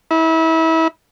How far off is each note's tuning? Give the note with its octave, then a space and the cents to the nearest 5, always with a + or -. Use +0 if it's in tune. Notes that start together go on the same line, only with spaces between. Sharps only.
E4 -30